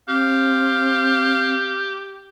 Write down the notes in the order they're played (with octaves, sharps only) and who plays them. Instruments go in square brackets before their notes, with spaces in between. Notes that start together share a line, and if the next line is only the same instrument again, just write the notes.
[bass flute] C4 [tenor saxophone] G4 [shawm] F5